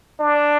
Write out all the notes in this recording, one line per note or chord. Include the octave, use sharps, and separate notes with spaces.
D4